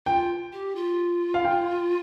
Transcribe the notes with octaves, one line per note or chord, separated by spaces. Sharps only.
F4 G5
G4
F4
F5
G5